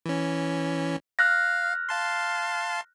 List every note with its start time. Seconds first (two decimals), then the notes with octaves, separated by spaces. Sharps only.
0.06 E3 C#4
1.19 F5 F6 F#6 A#6
1.89 F5 A5 C6